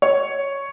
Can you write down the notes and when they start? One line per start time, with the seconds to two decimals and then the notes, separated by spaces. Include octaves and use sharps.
0.02 C#5